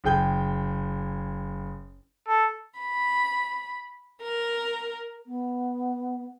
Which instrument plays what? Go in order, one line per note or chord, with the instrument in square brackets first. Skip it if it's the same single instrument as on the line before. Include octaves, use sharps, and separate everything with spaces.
[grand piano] F#1 G#4 G5 G6
[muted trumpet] A4
[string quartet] B5
A#4
[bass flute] B3